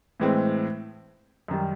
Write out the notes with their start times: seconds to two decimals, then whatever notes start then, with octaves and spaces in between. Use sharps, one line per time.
0.20 A2 E3 G#3 C4
1.48 F#2 D#3 G3